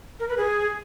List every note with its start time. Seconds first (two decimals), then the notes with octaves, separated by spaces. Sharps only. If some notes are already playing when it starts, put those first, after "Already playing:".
0.20 A#4
0.28 B4
0.37 G#4